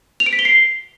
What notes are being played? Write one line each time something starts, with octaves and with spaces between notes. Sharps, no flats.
F7
D7
B6
G7
C7